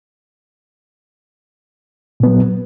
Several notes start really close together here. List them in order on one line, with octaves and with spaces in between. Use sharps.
A#2 B3 F#3